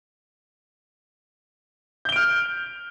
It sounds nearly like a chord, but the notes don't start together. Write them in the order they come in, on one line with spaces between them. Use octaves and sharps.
G6 G7 D7 F6